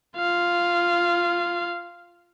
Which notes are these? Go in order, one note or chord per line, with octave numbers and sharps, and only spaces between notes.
F4 F5